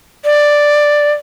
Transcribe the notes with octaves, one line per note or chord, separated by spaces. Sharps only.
D5